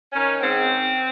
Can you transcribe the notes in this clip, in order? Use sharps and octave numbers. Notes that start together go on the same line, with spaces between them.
D#3 C#4
G#2 C4